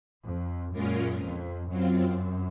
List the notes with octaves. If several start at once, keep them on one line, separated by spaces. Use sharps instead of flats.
F2
F#2 A#2 G#3 C#4 F4 A#4
F2
F#2 F#3 C4 F4